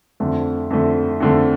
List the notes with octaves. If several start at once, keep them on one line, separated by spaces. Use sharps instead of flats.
F2 D3 A3
F2 D3 A3
F2 D3 A3